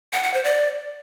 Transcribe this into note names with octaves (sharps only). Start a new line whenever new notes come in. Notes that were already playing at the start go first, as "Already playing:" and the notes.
F#5
F#5
C5
D5